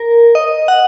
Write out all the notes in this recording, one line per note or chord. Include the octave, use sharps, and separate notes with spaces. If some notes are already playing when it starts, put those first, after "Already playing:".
Already playing: A#4
D#5
F#5